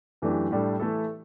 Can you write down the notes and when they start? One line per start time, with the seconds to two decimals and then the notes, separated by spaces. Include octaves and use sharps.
0.22 F#2 E3 A3 D4 G4
0.51 A2 G3 D4 A4
0.80 E3 A3 E4 A4